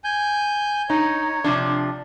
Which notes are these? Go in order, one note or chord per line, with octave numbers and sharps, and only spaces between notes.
G#5 G6
D#4 C#5
C3 F3 D4